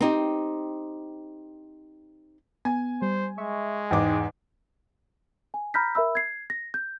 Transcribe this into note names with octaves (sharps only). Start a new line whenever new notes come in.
C4 D#4 G4
B3 G#5
G3 C5
G#3 E5 C#6
E2 G#2 D#4 G5 D6
G#5
A#5 B5 F6 G6 A#6 B6
A#4 E5 B5 E6
G#6 C7
A#6
G6